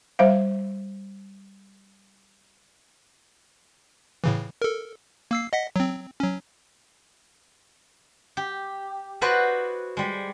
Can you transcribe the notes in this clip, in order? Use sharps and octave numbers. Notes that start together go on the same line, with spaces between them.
G3 C5 E5 F5
A2 C#3 E3
A4 A#4
A#3 E6 C7
D#5 F#5 B6
F#3 C4
F#3 C#4
G4
E4 F#4 B4 C5 D5 D#5
G3 G#3